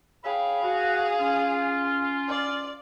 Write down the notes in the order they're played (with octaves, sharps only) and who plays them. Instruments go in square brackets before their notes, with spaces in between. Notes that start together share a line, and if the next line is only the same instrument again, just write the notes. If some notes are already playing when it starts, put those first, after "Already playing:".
[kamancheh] G#4 F5 [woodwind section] C#5 G5 B5
[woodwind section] F#4
C#4 F4
[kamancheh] D5